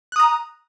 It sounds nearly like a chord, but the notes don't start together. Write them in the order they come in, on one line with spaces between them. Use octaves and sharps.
F#6 D#6 A#5